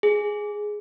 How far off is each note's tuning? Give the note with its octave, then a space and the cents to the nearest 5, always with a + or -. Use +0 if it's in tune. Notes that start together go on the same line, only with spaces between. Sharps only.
G#4 +5